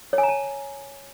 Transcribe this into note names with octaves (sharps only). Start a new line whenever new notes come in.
C#5
G#5
A#5
A5